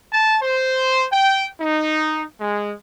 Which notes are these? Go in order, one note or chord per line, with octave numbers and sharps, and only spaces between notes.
A5
C5
G5
D#4
G#3